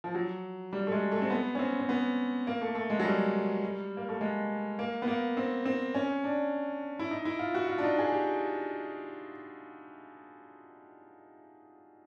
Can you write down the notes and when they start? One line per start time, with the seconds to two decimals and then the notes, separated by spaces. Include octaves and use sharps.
0.04 F3
0.15 F#3
0.73 G3
0.87 A3
0.92 G#3
1.12 A3
1.22 C4
1.30 B3
1.55 C#4
1.59 C4
1.80 C4
1.89 B3
2.47 A#3
2.61 A3
2.75 A3
2.90 G#3
2.99 F#3
3.05 G3
3.97 A#3
4.09 A3
4.21 G#3
4.79 A#3
5.02 B3
5.08 A#3
5.37 C4
5.66 C4
5.95 C#4
6.24 D4
6.99 E4
7.11 D#4
7.25 E4
7.39 F4
7.55 F#4
7.68 F4
7.78 D4
7.84 D#4
7.98 G#4
8.12 G4